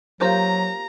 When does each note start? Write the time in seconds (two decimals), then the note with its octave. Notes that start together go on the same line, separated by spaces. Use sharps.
0.21 F#3 A#3 F4 G4 A#4 C5 F5 A#5